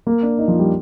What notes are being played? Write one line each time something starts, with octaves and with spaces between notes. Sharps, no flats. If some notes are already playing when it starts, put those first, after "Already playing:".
A#3
D4
D#4
F3
G3